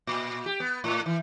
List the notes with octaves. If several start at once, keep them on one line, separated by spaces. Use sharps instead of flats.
A#2
G4
B3
A2
E3